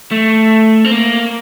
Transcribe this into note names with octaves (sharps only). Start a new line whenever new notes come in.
A3
C4
A#3